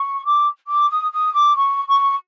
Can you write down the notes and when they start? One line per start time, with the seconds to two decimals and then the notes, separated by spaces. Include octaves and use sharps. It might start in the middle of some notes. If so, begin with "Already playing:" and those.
Already playing: C#6
0.24 D6
0.67 D6
0.89 D#6
1.11 D#6
1.33 D6
1.55 C#6
1.87 C#6